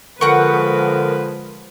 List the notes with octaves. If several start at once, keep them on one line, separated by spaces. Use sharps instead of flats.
D3 F3 G#3 A#4 B4 F#5 G5 C#6